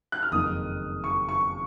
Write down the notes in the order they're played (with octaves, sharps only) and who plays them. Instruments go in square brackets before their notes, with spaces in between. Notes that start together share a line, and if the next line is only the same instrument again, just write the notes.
[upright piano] F#6
F6
[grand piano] F#1 F2 D#3 A#3 [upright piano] D#6
[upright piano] C#6
C#6